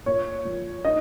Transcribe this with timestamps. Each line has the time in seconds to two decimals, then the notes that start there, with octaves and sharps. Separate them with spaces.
0.06 A#2 C#5
0.45 F3
0.85 D#4 D#5